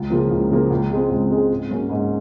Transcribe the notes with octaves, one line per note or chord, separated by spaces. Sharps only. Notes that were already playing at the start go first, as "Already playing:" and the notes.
Already playing: C#2
C#3 F3 A#3
C#2
C#3 F3 A#3
C#2
C#3 G#3 C4
C#2
C#3 G#3 C4
G#2
F#3 A#3 C#4
G#2